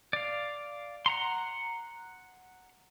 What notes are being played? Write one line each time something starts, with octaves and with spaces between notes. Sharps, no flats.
D5 F5
F#5 A#5 C6